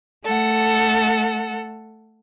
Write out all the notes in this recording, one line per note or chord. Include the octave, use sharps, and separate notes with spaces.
A3 A4 F#5